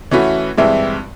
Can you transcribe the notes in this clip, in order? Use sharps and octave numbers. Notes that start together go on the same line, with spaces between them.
E3 A3 C#4 F#4 B4
G2 E3 G#3 C4 E4